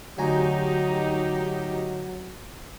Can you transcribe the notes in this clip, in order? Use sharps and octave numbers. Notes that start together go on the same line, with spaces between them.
D2 F#3 D#4 G4 G#5 A#5